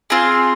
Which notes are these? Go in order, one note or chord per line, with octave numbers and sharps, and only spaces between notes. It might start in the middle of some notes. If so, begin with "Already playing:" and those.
C4 F4 G#4